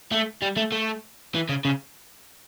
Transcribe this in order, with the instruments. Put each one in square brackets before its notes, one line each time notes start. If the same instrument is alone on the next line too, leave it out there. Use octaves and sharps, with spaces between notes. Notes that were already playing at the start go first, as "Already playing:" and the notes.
[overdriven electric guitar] A3
G3
A3
A3
E3
C#3
C#3